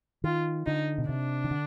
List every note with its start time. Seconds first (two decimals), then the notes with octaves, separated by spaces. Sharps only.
0.24 D#3 F4
0.66 D3 D#4
0.98 B2
1.09 C3 D4
1.44 D#3
1.51 D3